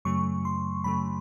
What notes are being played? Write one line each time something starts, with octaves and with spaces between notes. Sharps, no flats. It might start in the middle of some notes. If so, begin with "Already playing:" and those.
F#2 C#3 F#3 A3 C#6
C6
F#2 C#3 F#3 A3 B5